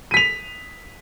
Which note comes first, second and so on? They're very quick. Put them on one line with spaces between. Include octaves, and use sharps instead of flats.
D#7 B6 F7